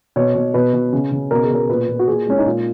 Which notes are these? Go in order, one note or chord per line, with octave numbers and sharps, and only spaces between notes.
B2 C#5
B2
B2 B4
B2
C#3
C#3
B2 A#4
G#4
B2 A#4
A#2 B4
A#2
F#4
A#2 G#4
G#3 C#4
D#4
A#2 F4